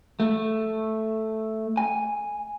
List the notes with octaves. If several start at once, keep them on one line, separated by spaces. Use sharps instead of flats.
A3
G#5